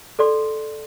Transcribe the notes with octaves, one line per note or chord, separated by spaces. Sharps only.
A4 D5 C6